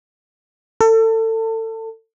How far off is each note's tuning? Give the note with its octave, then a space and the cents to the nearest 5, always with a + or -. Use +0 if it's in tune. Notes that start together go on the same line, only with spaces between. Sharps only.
A4 +30